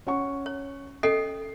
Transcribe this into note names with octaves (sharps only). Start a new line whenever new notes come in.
C#4 F#5 C#6
C#5
C#4 A4 D#5 C7